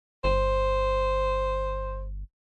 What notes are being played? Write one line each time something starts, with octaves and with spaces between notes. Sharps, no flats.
G1 C5